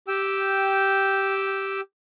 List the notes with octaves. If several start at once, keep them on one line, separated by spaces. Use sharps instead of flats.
G4 G5 E6